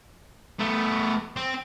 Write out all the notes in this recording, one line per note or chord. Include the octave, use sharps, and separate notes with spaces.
A3 B3
C4